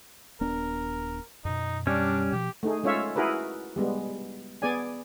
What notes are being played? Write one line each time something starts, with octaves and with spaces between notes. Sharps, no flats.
D#1 B3 D4 A#4
F#2 B2 D#4
G3 C#4 D4
B2 F3 G4
A3 D#4 G#4
G#3 C#4 F4 C#5 E5 F5
E4 F#4 G#4 A#4 B4
G3 G#3 B3
B3 G#4 D5 G#5